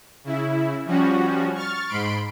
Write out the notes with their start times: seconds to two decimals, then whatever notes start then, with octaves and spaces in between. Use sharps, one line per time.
0.24 C#3 E4
0.85 F3 G3 C#4 F#4
1.54 C#6 F6 A6
1.87 G#2 B5 C6 D7